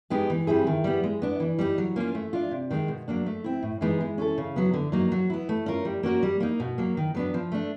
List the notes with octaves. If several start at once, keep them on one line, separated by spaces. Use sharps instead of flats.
G#3 B3 D#4 G4
E3
G3 C4 E4 G#4
D#3
G3 B3
G#3
B3 D4
E3
G3 B3 D#4
F#3
A#3 C#4 F4
A3
D4 F4
C3
D#3 G#3 C4 D#4
B2
F#3 A#3 D4
A3
C4 E4
A2
E3 G#3 B3 D#4
G#3
C#4 E4 A4
C#3
F#3 B3
D3
F#3 A#3 D#4
F#3
B3 E4
A3
C#4 F4 A#4
G3
A#3 C#4 F#4 A#4
G3
A#3 D#4
B2
F#3 A#3
D#3
F#3 B3 D4
F3
A3 D4